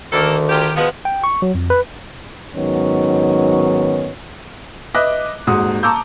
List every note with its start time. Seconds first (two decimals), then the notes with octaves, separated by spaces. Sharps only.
0.12 D2 D#3 A#3 A4
0.49 F#3 F4 G4
0.76 F3 G#3 B3 F4 F#4 B4
1.05 G5
1.24 C#6
1.42 F#3
1.54 F2
1.70 B4
2.55 G#2 D#3 F#3 B3 C#4
4.94 B4 D#5 E5 D6 F#6
5.47 D#1 G#2 F#4 D#6
5.83 A5 A#5 C#6 D6 E6 G6